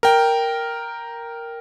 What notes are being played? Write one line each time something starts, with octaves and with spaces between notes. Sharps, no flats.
A#4 G5